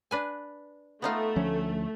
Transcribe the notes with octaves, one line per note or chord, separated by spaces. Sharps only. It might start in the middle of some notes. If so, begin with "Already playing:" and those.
D4 B4 G#5
A3 B3 D#4 F4
D2 F3 C#4